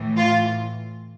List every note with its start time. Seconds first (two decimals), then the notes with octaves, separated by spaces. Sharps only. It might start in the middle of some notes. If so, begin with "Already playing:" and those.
Already playing: A2 E3
0.17 F4